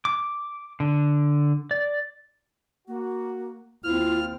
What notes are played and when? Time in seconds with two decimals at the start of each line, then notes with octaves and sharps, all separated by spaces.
0.05 D6
0.80 D3
1.71 D5
2.88 A#3 F#4
3.84 D#2 C4 E4 F4 F6